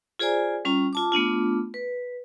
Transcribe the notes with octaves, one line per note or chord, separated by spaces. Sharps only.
F4 G#4 C5 D5 G#5 A#5
G3 C#4 F4 A#5
F4 A5 D6
A3 B3 D4 F4
B4